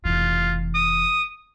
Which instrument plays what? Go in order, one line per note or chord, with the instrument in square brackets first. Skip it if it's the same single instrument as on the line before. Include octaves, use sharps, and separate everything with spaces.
[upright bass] F1 E3 [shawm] F4
[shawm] D#6